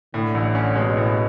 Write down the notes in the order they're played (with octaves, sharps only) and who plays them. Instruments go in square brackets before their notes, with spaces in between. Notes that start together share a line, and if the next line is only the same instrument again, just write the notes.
[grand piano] A2 [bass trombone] D3
[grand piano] A1
C#4
[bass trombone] B2 [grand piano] G#3
[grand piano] A2